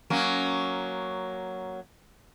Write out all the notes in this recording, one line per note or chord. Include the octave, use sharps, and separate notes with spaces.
F#3 A#3 C#4